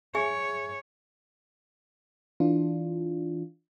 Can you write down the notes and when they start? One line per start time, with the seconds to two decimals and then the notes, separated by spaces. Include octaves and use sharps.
0.15 G#4 C#5 E5 G#5
2.40 E3 D4 F4